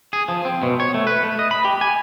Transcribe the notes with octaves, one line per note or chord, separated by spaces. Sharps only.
G#4
F3
C4
B2
C#5
A3
B4
A3
D#5
B5
G4
G#5